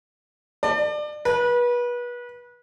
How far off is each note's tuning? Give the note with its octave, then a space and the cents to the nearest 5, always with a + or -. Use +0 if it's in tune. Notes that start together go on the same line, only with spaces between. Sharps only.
D5 +30
B4 -30